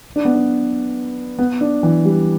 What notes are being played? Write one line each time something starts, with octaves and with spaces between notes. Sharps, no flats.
D4
B3
D4
B3
D4
E3
G3